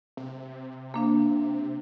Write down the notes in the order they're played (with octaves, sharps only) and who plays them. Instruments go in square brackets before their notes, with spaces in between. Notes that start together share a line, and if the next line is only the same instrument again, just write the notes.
[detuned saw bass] C3
[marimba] A#3 D4 F5